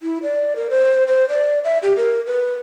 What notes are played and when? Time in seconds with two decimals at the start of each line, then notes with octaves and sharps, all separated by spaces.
0.03 E4
0.23 D5
0.56 A#4
0.70 C5
1.08 C5
1.29 D5
1.64 E5
1.83 G4
1.97 A#4
2.27 B4